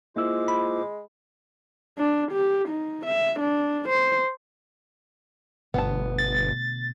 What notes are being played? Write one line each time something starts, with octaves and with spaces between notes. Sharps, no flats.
G#3 A#3 E4 F4 C5 D6 E6
B5
D4
G4
D#4
E5
D4
C5
G1 B2 D3 A3 B3 A5
A6